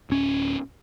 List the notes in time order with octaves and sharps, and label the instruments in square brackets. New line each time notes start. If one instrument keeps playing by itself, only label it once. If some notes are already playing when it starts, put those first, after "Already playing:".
[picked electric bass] D1 C#4